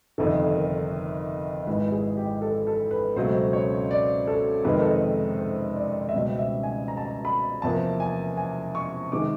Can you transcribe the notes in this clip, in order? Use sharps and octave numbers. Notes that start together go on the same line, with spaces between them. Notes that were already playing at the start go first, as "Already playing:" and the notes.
G1 F2 C3 D#3 A4
A#4
G#1 G#2 E3 B4
G#4
G4
A4
A4
B4
C#2 B2 F#3 A3 C4 C5
C#5
D5
A4
F2 C3 D#3 G#3 C4 B4
A#4
A4
A#4
C5
D5
E5
C#2 B2 G3 C4 D#5
E5
G#5
A#5
A5
A#5
B5
E2 C3 F3 A#3 A5
G#5
G#5
C#6
C3 D#3 G#3 D6